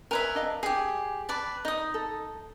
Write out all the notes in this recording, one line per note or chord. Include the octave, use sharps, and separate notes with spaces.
A#4 B4 C#5 E5 G#5
D4 D#5 F5
G4 G#4 G#5
B4 D5 A5
D#4 D#5 D#6
A4